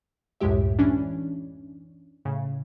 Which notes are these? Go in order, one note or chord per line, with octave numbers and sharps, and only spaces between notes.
C#2 F#2 A2 G#3 G4 E5
E3 C#4 D4
A2 C#3